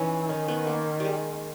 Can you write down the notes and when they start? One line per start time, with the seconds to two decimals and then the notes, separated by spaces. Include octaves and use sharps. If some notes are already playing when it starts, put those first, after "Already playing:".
Already playing: E3 C#4 D#4
0.29 D#3 C#4
0.48 B3
0.67 A#3
1.00 G3 G#3